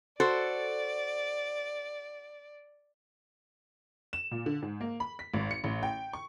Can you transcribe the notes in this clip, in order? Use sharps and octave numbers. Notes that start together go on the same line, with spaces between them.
F#4 A4 C5 D5
E7
A#2
D3
G#2
A#3
B5
B6
G#1
C#7
A1
G5
C#6